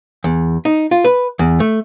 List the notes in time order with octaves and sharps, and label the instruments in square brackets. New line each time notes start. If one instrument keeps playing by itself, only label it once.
[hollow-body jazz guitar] E2
D#4
F4
B4
E2
A3